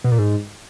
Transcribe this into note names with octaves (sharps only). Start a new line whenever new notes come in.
B2
A#2
G#2